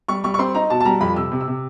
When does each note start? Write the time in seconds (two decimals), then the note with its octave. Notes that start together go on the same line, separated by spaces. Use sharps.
0.08 G3 C#6
0.24 G3 C#6
0.34 C#6
0.39 C4 C6
0.55 D#4 A#5
0.70 B2 A5
0.81 A5
0.85 G3 A#5
1.01 F2 B5
1.16 C3 E6
1.32 C3
1.40 E6
1.48 C3